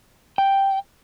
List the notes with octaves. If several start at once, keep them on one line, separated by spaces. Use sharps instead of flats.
G5